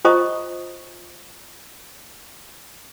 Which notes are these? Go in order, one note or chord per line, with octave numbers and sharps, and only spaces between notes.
F4 C5 D#5 A#5 C#6 D#6